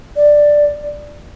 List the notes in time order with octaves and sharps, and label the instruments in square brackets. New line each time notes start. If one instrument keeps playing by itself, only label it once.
[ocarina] D5